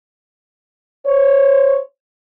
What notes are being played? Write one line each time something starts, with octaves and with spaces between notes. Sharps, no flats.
C5 C#5